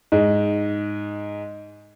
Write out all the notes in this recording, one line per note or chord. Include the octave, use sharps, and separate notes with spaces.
G#2 G#3